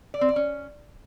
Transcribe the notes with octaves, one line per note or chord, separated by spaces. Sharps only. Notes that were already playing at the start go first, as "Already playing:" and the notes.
D5
C4
D5
C#4